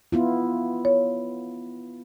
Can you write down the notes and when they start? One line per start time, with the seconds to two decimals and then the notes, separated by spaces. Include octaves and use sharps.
0.12 B3 E4 F4
0.85 C#5